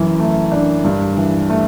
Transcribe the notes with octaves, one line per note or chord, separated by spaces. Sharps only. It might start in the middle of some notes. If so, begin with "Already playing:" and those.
Already playing: F#2 E3
A3
D4
G2
E3
A3